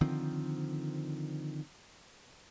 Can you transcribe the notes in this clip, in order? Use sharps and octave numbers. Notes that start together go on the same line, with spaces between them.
D3 D#3 F3 C4